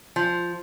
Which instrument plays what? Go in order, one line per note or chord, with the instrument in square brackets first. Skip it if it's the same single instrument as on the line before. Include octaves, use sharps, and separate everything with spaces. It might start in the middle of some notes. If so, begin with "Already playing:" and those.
[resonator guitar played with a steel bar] F3